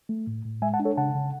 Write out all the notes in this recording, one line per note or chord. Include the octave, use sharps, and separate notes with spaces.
A3
A2
A2
G#3 E5 G#5
F#5 A5
D4
A4 C#5
C#3 F#5 A5
C#3